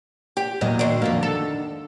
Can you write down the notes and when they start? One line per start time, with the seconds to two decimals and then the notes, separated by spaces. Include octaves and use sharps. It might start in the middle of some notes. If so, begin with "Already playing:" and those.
0.37 G4
0.61 E2 A#2 F#3 D#5
0.79 D3 D#3
1.02 F2 F3 A#3
1.23 A4